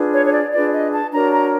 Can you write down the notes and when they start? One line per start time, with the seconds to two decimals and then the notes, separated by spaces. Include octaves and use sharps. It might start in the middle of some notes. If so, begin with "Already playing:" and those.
Already playing: D4 F4 G#4 B4
0.12 C#5
0.26 C#5
0.32 D5
0.52 D4 F4 G#4 B4 D5
0.73 D#5
0.92 A5
1.12 D4 F#4 A#4 C#5 A#5
1.32 A#5